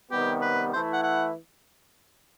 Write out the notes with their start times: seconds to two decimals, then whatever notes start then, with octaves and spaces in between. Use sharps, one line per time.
0.11 C3 D#3 G3 B3 G4
0.42 B4
0.73 E3 A3 E4 C5
0.93 F#5
1.03 F#5